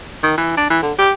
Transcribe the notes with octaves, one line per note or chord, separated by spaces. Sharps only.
D#3
E3
D4
E3
D3
G4